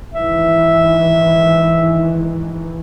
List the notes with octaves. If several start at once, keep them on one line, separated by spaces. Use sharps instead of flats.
G#2 D#3 E3 E5